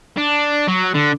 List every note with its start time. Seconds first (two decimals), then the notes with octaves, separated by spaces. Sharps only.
0.17 D4
0.68 F#3
0.94 D3